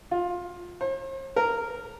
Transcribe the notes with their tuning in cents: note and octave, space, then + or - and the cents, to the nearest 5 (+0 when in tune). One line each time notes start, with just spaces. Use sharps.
F4 +20
C5 +45
A#4 -10